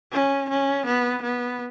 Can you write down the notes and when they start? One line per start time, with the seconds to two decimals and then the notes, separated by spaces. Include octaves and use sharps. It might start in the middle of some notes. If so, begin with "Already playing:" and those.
0.12 C#4
0.50 C#4
0.86 B3
1.23 B3